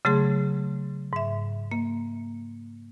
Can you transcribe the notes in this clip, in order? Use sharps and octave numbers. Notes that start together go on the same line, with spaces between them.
C#3 F#3 A3 G#4 C6
G#2 E5
A#3